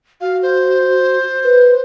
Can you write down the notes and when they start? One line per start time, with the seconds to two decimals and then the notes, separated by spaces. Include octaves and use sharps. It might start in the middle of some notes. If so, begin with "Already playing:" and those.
0.21 F#4 F5
0.42 C5
1.44 B4